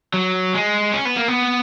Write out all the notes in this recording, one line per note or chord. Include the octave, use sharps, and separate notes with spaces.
F#3
G#3
C#4
B3
A#3
B3